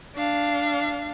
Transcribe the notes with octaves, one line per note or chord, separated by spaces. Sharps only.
D4 F5